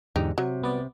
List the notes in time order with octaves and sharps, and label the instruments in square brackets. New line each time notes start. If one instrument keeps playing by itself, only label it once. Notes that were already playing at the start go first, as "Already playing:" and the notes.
[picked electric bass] E2 G#2 D3 [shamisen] D#4 G4
[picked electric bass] C3 [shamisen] F#3
[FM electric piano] C2 B3 D5